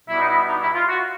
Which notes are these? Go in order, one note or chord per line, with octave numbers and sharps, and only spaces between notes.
B2 G3 E4
D#4
E4
D#4
E4
F4
F#4